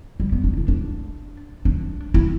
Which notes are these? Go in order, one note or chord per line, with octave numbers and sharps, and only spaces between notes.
G3
B3
D4
E4
D4
D4
E4